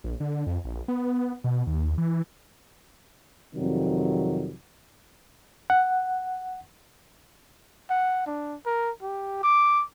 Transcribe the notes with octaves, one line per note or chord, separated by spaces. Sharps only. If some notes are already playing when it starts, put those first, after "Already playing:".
A#1
D3
F2
A#1
B3
B2
D#2
E3
F2 C3 D#3 F#3 G3
F#5
F#5
D4
A#4
G4
D6